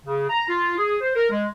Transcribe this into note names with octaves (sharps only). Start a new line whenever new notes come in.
C#3
A#5
F4
G#4
C5
A#4
G#3